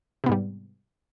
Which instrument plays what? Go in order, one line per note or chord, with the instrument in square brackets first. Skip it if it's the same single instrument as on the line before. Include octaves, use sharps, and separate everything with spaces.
[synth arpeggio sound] C3
B3
G#2
G3